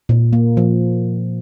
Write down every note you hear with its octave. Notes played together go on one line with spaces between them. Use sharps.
A#2
A#3
F3